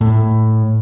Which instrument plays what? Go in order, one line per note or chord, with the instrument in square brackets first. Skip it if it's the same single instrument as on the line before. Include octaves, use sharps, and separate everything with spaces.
[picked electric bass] A2